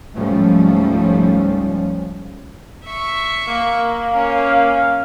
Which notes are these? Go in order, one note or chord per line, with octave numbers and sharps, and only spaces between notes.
C#2 G#2 F3 G3 A3 C#4
E5 C#6
A#3
C#4 F5